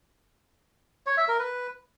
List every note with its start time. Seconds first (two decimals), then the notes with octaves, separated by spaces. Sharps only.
1.06 C#5
1.17 E5
1.28 A#4
1.39 B4